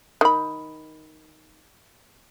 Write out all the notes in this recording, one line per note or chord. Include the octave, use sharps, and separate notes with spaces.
D#3 B5